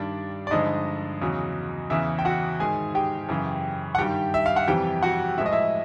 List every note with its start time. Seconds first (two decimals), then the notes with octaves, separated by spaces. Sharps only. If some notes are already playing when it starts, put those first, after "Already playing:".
Already playing: G2 D#3 G3 D4 D5
0.47 D5
0.51 G2 D3 F3 G#3 D#4 D#5
1.21 E2 C#3 F#3
1.90 E2 C#3 E3 E4 E5
2.19 G5
2.25 F#4 F#5
2.60 G#2 D#3 G#3 G#4 G#5
2.95 G4 G5
3.29 F#2 C#3 E3
3.95 F#5
3.98 G2 D#3 G3 G4 G5
4.34 E5
4.46 F5
4.56 F#5
4.68 F2 C3 E3 G3 G4 G5
5.03 F#4 F#5
5.37 A2 F3 G#3 E5
5.46 D#5
5.52 E4 E5